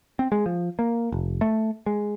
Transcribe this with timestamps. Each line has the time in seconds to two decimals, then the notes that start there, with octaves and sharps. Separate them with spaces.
0.19 C4
0.32 G#3
0.46 F3
0.79 A#3
1.12 F1
1.41 A3
1.86 G#3